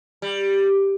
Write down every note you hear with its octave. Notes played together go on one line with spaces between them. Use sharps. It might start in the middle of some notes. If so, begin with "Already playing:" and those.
G3